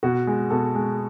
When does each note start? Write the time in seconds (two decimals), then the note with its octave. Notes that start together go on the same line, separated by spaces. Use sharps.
0.03 B2 F#4
0.27 G#3
0.50 B2 A4
0.75 G#3